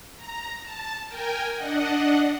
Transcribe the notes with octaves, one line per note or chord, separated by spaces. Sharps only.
A#5
A5
A#4 G5 G#5
D4 D#5 F#5